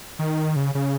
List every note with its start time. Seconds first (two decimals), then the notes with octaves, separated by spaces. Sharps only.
0.19 D#3
0.56 C#3
0.75 C#3